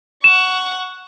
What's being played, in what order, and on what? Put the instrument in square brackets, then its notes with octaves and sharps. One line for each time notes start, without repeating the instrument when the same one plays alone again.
[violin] F#5 C#6 [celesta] E7